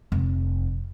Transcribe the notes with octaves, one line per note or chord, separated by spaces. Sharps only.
F1